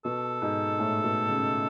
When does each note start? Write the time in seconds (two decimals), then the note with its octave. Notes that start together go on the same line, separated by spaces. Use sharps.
0.05 B2 A4
0.42 G#2
0.79 A2
1.04 B2
1.29 C#3